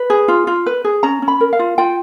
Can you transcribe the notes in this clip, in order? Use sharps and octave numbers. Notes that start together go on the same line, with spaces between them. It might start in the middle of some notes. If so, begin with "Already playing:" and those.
Already playing: B4
G#4
F4
F4
B4
G#4
C#4 A#5
C#4
B5
A#4
F5
F4
F4 G5